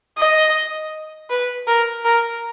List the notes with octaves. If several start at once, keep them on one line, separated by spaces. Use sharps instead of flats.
D#5
B4
A#4
A#4